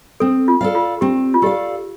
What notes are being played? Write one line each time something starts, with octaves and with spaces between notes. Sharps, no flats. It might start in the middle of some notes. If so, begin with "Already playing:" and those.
C4 A4
F4
A4 D5 F5
F4
C4 G4
F4
G4 A4 D5 F5